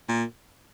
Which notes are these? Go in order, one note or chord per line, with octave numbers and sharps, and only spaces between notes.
A#2